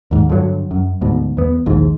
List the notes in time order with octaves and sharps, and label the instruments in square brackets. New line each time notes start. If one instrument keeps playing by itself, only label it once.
[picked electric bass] D#2 G#2
G2 D3 D#3 F#3
F#2
D2 G#2 B2
E2 B3
A#1 D#2 G#2